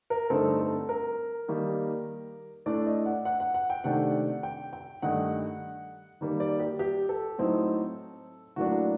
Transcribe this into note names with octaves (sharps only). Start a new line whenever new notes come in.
A#4
G2 D3 A3 C4 D#4 A4
A4
A#4
D#3 G3 A#3 D#4
A2 A3 D4 D5
D#5
F#5
F#5
F#5
F#5
G5
C3 D#3 A3 D4 F#5
G5
G5
G2 D#3 A3 D#4 F#5
D#3 G3 A#3
D5
G4
G4
A4
A2 F#3 C4 D#4
A2 F#3 A#3 D4 F#4